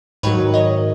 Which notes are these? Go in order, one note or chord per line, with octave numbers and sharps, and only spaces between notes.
G#2 D#3 F#3 B4 C#5
C#5 D#5